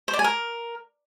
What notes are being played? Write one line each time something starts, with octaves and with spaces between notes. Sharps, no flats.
C5
D5
G#5
A#4